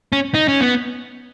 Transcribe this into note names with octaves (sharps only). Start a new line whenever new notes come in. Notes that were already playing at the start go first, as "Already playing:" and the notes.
C#4
D#4
C#4
B3